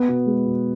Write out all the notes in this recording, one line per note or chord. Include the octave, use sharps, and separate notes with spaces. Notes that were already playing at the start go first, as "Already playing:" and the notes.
Already playing: B3
B2
G#3
B2